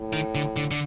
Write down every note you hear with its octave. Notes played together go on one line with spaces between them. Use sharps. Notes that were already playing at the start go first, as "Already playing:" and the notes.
Already playing: A2
D#3
D3
D3
D3